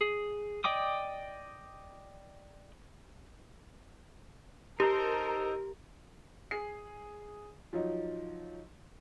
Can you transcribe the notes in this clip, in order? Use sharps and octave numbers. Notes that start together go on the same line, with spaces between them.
G#4
D5 D#5 G5 D6 D#6
D#4 G4 A4 A#4 C5
G#4 C7
F3 F#3 D#4